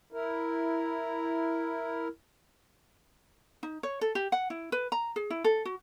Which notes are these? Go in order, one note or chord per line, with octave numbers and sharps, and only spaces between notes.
E4 A#4
D#4
C#5
A4
G4
F#5
E4
B4
A#5
G#4
E4
A4
F#4